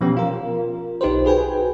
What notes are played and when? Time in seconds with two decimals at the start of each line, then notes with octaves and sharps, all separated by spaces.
0.01 B2 F3 B3 C#4 G4
0.17 F4 A#4
1.01 B1 D#4 G4 B4 C5
1.25 F#4 G#4 B4 G5 G#5